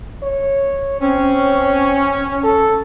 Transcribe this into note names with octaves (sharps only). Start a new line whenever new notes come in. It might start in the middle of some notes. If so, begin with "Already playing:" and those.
C#5
C4 C#4
A4